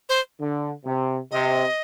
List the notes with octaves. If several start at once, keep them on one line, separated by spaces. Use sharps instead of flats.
C5
D3
C3
C3 D#5